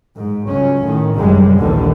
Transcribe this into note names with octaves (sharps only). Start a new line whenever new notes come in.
G#2
C#2 F#3 C#4
A2 D#3
G#1 F#2 C3 G3 G#3
A#1 D#2 B2 D3 E3 G3